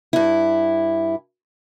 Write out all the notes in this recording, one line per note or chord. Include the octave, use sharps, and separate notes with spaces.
G2 E4